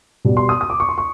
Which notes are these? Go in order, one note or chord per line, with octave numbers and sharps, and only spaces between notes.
B2 G3 B3
C6
D#6
D#6
D6
C#6
C6
C#6